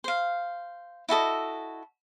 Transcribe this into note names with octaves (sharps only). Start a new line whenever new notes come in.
C5 F5
E4 F#4 A4 D#5